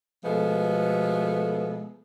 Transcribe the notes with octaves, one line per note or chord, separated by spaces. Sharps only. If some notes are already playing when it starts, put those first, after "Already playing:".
B2 F3 G#3 A3 B3 A4